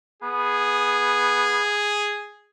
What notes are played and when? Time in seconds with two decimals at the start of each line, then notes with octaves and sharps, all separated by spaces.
0.23 B3 G#4